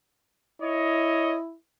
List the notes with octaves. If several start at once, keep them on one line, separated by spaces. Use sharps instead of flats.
E4 C#5 D#5